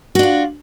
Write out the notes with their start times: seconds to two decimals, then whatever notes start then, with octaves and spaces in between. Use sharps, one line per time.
0.15 F#4
0.19 D4
0.23 F4